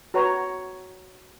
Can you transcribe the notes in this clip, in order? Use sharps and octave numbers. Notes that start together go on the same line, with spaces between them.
F#4 B4 C#5 A#5